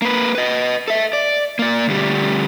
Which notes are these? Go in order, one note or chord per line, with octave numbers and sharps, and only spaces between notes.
A#3 B4
B4 D#5
A4 E5
D5
A#3 D5
D2 G3